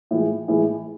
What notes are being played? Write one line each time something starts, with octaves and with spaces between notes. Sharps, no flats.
A2 E3 G#3
A2 E3 G#3